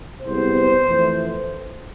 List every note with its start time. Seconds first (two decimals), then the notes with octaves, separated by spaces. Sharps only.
0.22 C2 C3 G#3 B3 C5
0.84 F2 E3 A3